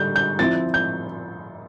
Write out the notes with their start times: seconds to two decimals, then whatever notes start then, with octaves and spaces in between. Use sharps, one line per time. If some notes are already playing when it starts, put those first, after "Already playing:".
Already playing: D3 G3 D4 G6
0.16 G6
0.39 F3 C4 E4 A6
0.74 G6